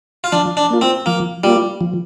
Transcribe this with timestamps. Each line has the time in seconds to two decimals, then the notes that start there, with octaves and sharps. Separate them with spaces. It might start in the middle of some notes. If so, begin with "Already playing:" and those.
0.24 F4
0.32 F3 D4
0.57 D4
0.70 A#3 F4
0.81 C4
1.06 F3 A#3
1.43 G3 A#3 F4
1.81 F3